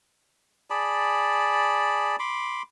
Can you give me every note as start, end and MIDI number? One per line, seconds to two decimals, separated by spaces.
0.70 2.16 68
0.70 2.16 74
0.70 2.16 81
0.70 2.16 83
2.19 2.62 83
2.19 2.62 84
2.19 2.62 86